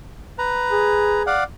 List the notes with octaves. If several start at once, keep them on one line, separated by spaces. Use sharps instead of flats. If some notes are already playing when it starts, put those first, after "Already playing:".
B4 A#5
G#4
D5 F5 F#5